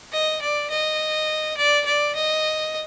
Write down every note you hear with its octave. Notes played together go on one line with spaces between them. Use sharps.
D#5
D5
D#5
D5
D5
D#5